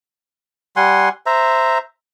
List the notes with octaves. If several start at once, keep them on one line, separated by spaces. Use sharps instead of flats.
G3 F#5 G#5 C6
C5 E5 A#5